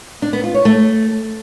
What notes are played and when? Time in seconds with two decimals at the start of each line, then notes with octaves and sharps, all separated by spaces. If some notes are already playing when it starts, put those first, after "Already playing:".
0.22 D4
0.33 B3
0.44 F4
0.54 C#5
0.65 A3